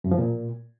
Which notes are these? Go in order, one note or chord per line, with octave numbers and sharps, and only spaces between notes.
F#2
F3
A#2